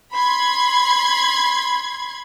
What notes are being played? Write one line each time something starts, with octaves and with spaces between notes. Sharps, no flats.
B5 C6 G#6